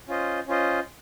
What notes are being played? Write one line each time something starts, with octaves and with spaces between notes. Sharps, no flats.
C#4 F4 C5 D#5
C#4 F4 C5 D#5